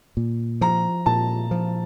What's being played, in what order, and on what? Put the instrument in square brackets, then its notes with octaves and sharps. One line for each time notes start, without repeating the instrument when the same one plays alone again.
[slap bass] A#2
[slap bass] F3 [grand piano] A#5
[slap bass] A#2 [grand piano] A5
[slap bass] F3